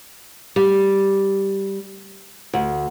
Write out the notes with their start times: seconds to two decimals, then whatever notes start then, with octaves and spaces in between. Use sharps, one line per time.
0.56 G3
2.54 D2